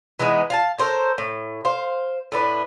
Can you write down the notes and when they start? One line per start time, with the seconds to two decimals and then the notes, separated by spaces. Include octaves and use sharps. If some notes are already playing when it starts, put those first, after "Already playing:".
0.19 E3 G#3 B3 D#4
0.50 F5 G#5 A5
0.78 A4 A#4 C5 C#5
1.18 A2
1.65 C5 F5
2.32 A2 D4 B4